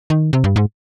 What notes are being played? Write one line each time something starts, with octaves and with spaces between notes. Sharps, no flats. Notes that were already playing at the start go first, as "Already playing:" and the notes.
D#3
C3
G2
G#2